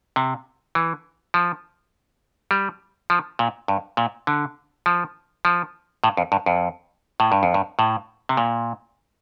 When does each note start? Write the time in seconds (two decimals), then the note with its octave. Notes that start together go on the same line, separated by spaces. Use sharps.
0.16 C3
0.75 E3
1.34 F3
2.51 G3
3.10 F3
3.39 A#2
3.68 G2
3.97 A#2
4.27 D3
4.86 F3
5.45 F3
6.04 A2
6.17 F2
6.32 G2
6.46 F2
7.20 A2
7.32 G2
7.43 F2
7.54 G2
7.79 A2
8.29 C3
8.37 A#2